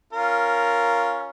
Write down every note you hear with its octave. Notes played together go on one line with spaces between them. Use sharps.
C#4 F4 A#4